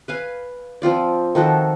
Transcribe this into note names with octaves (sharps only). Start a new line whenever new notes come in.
B4 F5 G#5
F3 C4 F4 D5
D#3 F3 F#4 A4